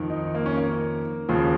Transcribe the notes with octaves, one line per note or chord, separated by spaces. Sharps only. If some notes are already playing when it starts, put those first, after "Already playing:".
Already playing: F2 D#3
D#4
A#3
C#4
A#3
D#2 C#3 F3